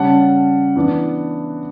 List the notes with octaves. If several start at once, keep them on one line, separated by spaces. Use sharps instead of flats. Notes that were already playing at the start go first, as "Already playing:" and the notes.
Already playing: C#3 G3 C#4 F#5 A5
E3 B3 D4